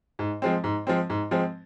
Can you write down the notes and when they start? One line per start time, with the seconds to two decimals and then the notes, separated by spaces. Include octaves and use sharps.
0.19 G#2
0.42 F3 G#3 C4
0.64 G#2
0.87 F3 G#3 C4
1.10 G#2
1.31 F3 G#3 C4